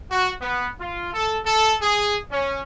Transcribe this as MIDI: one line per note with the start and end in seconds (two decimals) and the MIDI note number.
0.11 0.31 66
0.41 0.69 59
0.80 1.09 65
1.13 1.38 69
1.46 1.74 69
1.81 2.17 68
2.31 2.60 61